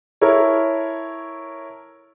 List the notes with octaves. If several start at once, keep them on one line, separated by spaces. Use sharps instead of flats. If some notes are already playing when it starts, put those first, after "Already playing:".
E4 A4 A#4 C#5